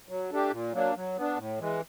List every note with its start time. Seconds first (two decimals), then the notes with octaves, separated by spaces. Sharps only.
0.09 F#3
0.30 A3 D4 G4
0.51 A#2
0.73 F#3 A#3 D4
0.95 F#3
1.17 B3 D4
1.38 A2
1.60 E3 G#3